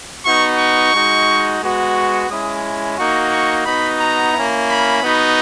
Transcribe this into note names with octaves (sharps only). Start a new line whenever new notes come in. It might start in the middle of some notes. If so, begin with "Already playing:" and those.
B3 D#4 F#4 C#6
C#6
G#3 D#4 F#4
G#3 B3 F#4
C#6
G#3 C#4 E4 D#6
A#3 D#4 F#4 C#6
C#6
B3 D#4 F#4 B5
A#5
A#3 C#4 E4
B5
B3 D#4 F#4